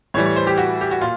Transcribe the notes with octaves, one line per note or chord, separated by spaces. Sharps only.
A2 E3 G3 C#5
C#5
C5
G4
F#4
G4
F#4
A#2 F4